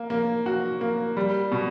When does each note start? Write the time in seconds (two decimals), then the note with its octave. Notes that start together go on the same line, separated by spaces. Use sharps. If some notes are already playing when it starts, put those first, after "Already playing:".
Already playing: A#3
0.10 A#3
0.46 F#4
0.81 A#3
1.17 G3
1.52 B2